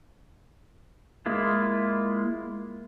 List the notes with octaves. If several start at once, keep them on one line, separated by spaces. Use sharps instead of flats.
G#3 A#3 E4 F4